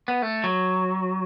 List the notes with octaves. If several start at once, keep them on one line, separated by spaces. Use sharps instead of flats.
B3
A3
F#3